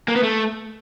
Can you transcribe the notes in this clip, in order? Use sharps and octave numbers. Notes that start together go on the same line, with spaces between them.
A#3
B3
A3